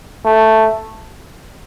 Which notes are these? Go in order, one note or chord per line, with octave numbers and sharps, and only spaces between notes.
A3